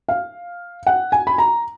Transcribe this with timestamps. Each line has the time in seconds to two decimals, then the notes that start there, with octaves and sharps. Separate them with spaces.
0.08 F5
0.87 F#5
1.12 G#5
1.27 B5
1.38 A#5